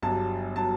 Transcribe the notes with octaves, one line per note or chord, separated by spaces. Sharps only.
G1 G2 F#3 A5
F#3 A5